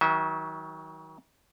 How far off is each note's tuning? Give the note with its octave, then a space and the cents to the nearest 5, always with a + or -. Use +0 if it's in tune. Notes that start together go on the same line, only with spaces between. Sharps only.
D#3 +40 F#3 +20 E5 -25